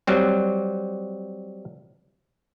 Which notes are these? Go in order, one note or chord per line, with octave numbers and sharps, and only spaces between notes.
F#3 G3 C4